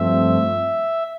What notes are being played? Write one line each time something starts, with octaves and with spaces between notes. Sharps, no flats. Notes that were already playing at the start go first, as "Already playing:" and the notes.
Already playing: G2 F3 A3 C4 E5